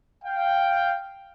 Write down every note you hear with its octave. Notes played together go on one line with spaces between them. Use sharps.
F5 G5